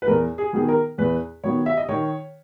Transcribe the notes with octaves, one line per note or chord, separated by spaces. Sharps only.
B4
E2 A#4
G#4
D#3 F#3 B3 G#4
A#4
E2 B4
D#3 F#3 B3 C#5
E5
D#5
D#3 C#5